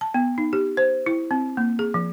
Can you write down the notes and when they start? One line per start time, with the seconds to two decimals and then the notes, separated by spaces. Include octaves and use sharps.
0.01 A5
0.14 B3
0.38 D#4
0.53 G4
0.77 C5
1.06 E4
1.31 C4
1.57 A#3
1.79 G#4
1.94 F3